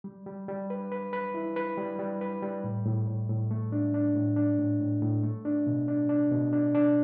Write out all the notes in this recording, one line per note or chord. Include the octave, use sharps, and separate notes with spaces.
G3
G3
G3
B4
B4
B4
E4
B4
G3
G3
B4
G3
A2
A2
A2
A2
A3
D4
D4
A2
D4
A2
A2
A2
A3
D4
B2
D4
D4
B2
D4
D4